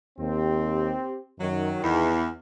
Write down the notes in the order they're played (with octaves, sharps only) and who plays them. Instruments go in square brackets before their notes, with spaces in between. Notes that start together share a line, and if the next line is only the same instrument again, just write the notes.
[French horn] D#2 [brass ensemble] C4 G4
[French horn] F#2 [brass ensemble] D#3 [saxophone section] F#3
[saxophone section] E2 [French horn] E4